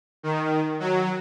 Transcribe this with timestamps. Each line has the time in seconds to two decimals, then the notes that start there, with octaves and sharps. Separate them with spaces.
0.23 D#3
0.80 F#3